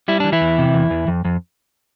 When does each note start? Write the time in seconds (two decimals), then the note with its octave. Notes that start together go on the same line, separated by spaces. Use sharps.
0.08 G3 E4
0.20 E3 D4
0.32 E3 E4
0.41 E2
0.58 C3
0.74 E2
0.90 E2
1.08 F2
1.25 F2